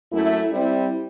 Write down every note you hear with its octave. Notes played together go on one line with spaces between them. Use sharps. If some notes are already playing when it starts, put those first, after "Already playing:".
F#2 A3 E4
G3 C4 E4